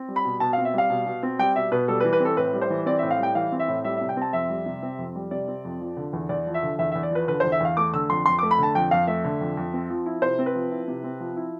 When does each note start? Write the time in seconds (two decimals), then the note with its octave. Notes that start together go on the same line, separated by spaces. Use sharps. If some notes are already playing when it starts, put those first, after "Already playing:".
Already playing: C4
0.08 G3
0.16 B5
0.25 B2
0.40 B2 A5
0.53 F5
0.58 C4
0.65 E5
0.74 G3 F5
0.90 B2
1.07 B2
1.23 C4
1.39 G3 G5
1.55 B2 E5
1.72 B2 B4
1.88 G3 A4
2.00 B4
2.04 E3
2.13 B4
2.20 C4 A4
2.37 A2 B4
2.53 G3
2.61 C5
2.70 E3
2.86 C4 D5
2.99 E5
3.03 A2
3.11 F5
3.19 G3 G5
3.35 E3 F5
3.52 C4
3.59 E5
3.68 A2
3.84 G3 E5
3.97 E5
4.01 C3
4.09 G5
4.17 C4 A5
4.33 F2 E5
4.50 G3
4.66 C3
4.82 C4
4.99 F2
5.15 G3
5.31 C3 D5
5.48 C4
5.65 F2
5.81 F3
5.97 D3
6.13 E2
6.29 E2 D5
6.47 F3
6.54 E5
6.63 D3
6.79 E2 E5
6.92 E5
6.95 E2
7.03 D5
7.11 F3 B4
7.28 D3 B4
7.40 C5
7.44 E2
7.52 E5
7.60 E2 F5
7.77 A3 D6
7.93 D3 E6
8.10 F2 C6
8.26 F2 C6
8.39 D6
8.43 A3
8.51 B5
8.58 D3 A5
8.75 F2 G5
8.91 F2 F5
9.07 A3 E5
9.24 D3
9.41 F2
9.57 F2
9.74 C4
9.90 F3
10.06 E4
10.22 C3 C5
10.39 C4
10.46 B4
10.55 F3
10.71 E4
10.88 C3
11.04 C4
11.20 F3
11.37 E4